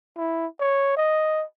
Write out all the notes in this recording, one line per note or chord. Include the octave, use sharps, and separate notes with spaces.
E4
C#5
D#5